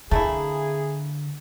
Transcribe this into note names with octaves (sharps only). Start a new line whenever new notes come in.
D3 A3 A#3 E4 G#4